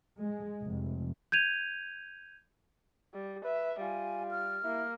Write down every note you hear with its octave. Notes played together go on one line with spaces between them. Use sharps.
G#3
F1
G6 G#6 D#7 F7
G3
B4 E5
G3 F4 G#5
F6
A#3 E4